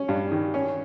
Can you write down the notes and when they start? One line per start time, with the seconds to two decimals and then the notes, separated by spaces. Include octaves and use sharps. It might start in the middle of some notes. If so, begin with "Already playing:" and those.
Already playing: C#4
0.08 G2
0.31 D#3
0.54 C#4